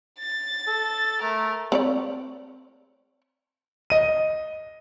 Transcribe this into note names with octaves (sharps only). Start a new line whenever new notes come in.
A6
A4
A3 A#4
C4 C#5 D5
D#5 D#7